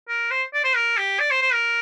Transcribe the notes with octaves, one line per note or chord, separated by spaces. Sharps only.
A#4
C5
D5
C5
A#4
G4
D5
C5
C5
A#4